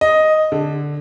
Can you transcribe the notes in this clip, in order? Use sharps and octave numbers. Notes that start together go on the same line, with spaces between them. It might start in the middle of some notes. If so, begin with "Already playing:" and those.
D#5
D3